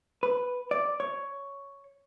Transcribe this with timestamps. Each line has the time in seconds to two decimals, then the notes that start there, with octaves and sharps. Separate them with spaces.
0.23 B4
0.71 D5
1.00 C#5